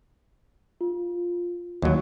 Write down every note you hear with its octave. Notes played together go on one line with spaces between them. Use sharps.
F4
D#2 F#3